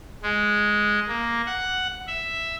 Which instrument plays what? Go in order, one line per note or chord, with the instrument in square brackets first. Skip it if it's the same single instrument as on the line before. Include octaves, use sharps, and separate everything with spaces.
[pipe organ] G#3
A#3
F#5
E5